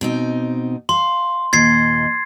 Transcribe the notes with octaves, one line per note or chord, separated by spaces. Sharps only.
B2 C4 D#4
F5 C6
D#2 A#2 D#5 G#6 A6 C7